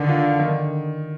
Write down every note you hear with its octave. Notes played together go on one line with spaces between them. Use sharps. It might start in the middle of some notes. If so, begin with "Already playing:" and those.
Already playing: D3 D#3
F4
D#3